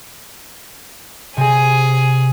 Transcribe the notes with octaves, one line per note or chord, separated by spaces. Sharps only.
C3 G#4 G#5